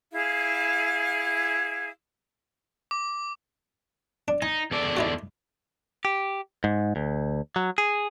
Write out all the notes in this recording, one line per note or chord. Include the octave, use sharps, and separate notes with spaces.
E4 G#4 F5
D6
D4
D#4 G#5
E2 A4 D5
D#4 E4 F#4
G4
G#2
D2
F#3
G#4